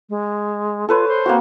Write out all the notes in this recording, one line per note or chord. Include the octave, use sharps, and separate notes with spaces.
G#3
F4 A4 B4 C#5
C5
A#3 C4 F#4